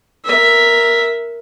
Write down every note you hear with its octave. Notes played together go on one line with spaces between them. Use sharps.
A#4 E5